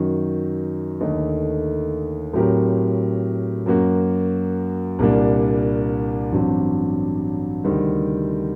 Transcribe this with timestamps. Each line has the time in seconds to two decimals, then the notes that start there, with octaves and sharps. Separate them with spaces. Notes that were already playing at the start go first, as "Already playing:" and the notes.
Already playing: F#2 D#3 F#3
1.01 D#2 D3 A3 D#4
2.33 A2 F#3 C4 G4 A#4
3.66 F#2 F#3 A#3 F#4
4.99 C2 A#2 G3 A#3 D4
6.31 A1 G2 F#3 C4
7.64 D2 C3 D#3 G3 C4